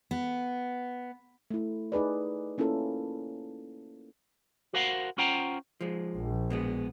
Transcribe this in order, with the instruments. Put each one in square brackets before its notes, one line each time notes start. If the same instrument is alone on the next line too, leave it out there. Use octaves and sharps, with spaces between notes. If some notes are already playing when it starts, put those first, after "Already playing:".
[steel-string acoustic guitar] B3
[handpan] A3 E4
D#4 G#4 B4 D5
A#3 C#4 E4 F4 A4 A#4
[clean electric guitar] F#4 A#4 C5 F5 F#5
C#4 F4 C5 F#5 G5 A#5
[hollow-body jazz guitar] F3 G#3
[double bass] A#1
[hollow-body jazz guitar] B2 G#3 B3